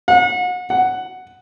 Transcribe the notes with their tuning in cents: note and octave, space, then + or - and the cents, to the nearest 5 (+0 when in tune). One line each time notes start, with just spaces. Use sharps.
F#5 -35
F#5 +5